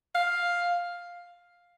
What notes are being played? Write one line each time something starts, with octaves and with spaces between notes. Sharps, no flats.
F5